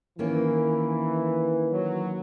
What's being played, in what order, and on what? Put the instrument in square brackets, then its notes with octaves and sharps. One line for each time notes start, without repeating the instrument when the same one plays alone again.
[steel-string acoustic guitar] D#3 A#3 C#4 [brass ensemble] E3
[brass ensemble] F#3